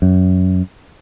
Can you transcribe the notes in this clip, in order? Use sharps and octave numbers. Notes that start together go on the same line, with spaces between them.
F#2